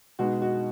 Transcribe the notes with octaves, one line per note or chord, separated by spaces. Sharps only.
B2 G#3 D#4 F#4
F#4